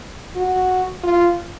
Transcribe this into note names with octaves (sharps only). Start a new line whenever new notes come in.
F#4
F4